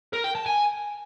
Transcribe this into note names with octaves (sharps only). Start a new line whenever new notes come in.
A#4
G5
A5
G#5